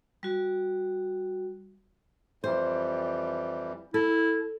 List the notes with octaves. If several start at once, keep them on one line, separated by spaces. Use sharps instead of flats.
G3 F#4
F2 E3 G3 C5
E4 A4